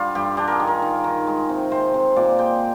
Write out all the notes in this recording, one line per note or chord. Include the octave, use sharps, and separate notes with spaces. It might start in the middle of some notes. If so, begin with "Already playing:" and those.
Already playing: D3 G3 F4
G2 G4
D4 G4
G#4 A#4
D#3
A#4
D#3
D#3
G#3
C3
C3 C5
C3
A#2 D5
G#3 G5